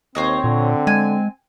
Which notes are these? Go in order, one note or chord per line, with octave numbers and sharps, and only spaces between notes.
D#2 C4 C5 C#5 D#5
A#2 D3
G#3 G#5